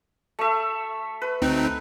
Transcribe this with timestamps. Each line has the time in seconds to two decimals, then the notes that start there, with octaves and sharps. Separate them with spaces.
0.39 A3 E5
1.22 B4
1.42 D2 C4 D#4